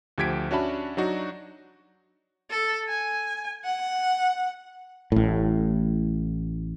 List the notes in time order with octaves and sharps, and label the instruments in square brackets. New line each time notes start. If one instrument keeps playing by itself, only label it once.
[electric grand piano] D2 F3 G4 G#6 B6 D7
C#4 D4 F#4 E5 A5 B5
F#3 D4 D#4 F#4
[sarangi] A4
G#5
F#5
[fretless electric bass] A1 A2